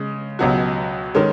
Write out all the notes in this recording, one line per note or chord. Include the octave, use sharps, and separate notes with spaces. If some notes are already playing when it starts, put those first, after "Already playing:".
Already playing: C#3 G#3
C#2 B2 F#3 C#4 F#4
D#3 G#3 C#4